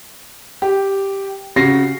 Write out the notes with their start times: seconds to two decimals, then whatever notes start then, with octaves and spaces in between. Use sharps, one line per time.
0.62 G4
1.56 C#3 F#4 A#6 C7